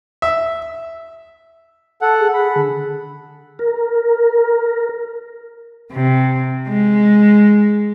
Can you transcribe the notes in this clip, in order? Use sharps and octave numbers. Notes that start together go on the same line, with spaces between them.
E5
A4 F#5
G#4
B5
D3
A#4
C3
G#3